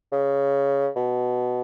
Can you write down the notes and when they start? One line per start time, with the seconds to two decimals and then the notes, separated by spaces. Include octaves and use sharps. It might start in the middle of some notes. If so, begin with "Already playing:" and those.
0.12 C#3
0.96 B2